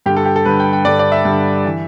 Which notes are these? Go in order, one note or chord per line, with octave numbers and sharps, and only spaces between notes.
G2 D3 G4
A4
G4
A4
G2 D3 B4
G5
G5
G2 D3 D5
D5
E5
G2 D3
E3